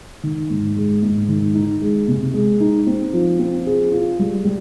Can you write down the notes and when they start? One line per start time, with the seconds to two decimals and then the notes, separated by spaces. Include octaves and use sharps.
0.23 D#3
0.50 G#2
0.76 G#3
1.02 G#2
1.28 D#3
1.55 D#4
1.82 G#3
2.08 C3
2.34 G#3
2.60 D#4
2.87 C4
3.13 F3
3.39 C4
3.66 G#4
3.92 F4
4.19 G3
4.45 G3